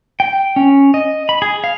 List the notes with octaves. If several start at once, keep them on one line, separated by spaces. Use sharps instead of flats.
G5
C#4
D#5
B5
G#4
F5